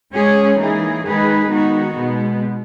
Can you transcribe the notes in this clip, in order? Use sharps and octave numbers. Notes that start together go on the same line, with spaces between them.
G#3 C#4 G#4 C#5
E3 A#3 D#4 G#4
D#3 G#3 D#4 G#4 B4
D#3 G#3 B3 D#4 F#4
B2 G#3 B3